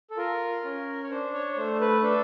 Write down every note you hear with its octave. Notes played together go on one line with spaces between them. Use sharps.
A4
F4 A#4
C#4
C#5
D4 C5
C#5
C#5
A3 C5
B4
D4 A4